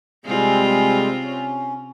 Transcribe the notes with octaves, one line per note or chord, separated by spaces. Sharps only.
C3 G3 G#3 C4 F4 G#4
C#4